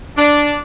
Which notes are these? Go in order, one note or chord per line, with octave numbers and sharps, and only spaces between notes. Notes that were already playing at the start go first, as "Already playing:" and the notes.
D4